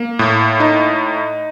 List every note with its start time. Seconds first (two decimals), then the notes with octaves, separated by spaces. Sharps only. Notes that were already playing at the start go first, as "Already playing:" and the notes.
Already playing: A#3
0.19 A2
0.60 D#4